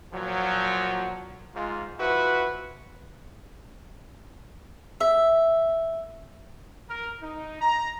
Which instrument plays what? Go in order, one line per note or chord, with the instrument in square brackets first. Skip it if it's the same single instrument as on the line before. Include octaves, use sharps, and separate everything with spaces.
[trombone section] A#2 F3 F#3
G#2 F4
F3 E4 F#4 B4
[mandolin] E5
[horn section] A#4
D#4
A#5